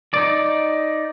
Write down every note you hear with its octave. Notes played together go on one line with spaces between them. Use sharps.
D#4 D5